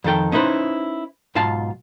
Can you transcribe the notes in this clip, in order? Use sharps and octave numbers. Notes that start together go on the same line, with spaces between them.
F2 D#3 A4 G5
C#4 D#4 E4 B4 C5
B1 G#2 F4 F5 A5